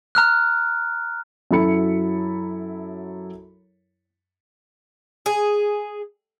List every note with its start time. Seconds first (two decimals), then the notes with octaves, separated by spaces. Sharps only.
0.15 A#5 F6 F#6
1.51 F#2 F#3 E4 A4 B5 C#7
5.26 G#4